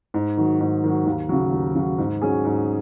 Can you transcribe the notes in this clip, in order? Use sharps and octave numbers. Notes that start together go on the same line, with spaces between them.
G#2
D#3 F#3
G#2
D#3 F#3
D#2
C#3 F#3
D#2
C#3 F#3
G#2
F#3 C#4 G#4
G#2